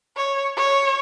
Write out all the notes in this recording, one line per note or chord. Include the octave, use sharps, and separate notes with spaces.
C#5
C#5